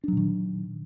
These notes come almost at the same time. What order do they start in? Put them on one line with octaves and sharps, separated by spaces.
D4 F#3 A#2 D#3